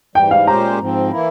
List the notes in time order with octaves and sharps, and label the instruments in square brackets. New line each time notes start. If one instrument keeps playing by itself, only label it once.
[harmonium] G#2 E3 G3 [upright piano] G5
[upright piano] F5
[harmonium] A#2 G#3 C#4 G4 C5 [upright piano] A#5
[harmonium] G#2 F3 C4
E3 A#3 E4